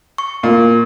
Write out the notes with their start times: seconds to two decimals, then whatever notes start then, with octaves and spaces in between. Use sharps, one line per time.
0.18 C#6
0.43 A#2